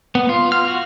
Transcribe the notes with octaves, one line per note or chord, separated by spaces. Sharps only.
B3
F4
F6
F#4